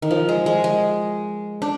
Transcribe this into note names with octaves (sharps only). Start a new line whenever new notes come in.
D#3
F3
G#3
G#3
G#3
D4